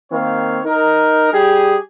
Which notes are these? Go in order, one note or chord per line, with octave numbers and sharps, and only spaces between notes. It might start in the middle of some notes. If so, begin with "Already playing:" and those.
D#3 A#3 C4 C#5 F5
D#4 A#4
G3 G4 G#4